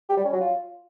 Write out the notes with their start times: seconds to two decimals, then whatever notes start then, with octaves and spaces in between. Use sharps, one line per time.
0.09 G4
0.17 G3
0.25 C#4
0.33 F#3
0.40 F4